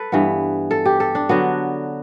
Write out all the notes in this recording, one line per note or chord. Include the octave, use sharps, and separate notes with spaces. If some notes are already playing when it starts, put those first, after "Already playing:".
Already playing: A4 B4
G2 E3 B3
A4
G4
A4
D4
D3 F#3 B3 F#4